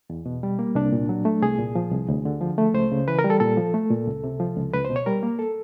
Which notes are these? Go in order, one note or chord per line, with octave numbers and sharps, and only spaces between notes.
E2
B2
G3
A#3
C2 D4
A#2
F#3
A3
C2 G#4
A#2
F3
C2
D2
D3
F3
A3
C#2 C5
C#3
E3 B4
A#4
G3
A4
A#2 A4
F3
A3
A#2
C#2
C3
F3
C#2
C#2 B4
C5
B2
C#5
G3 A#4
A#3
A4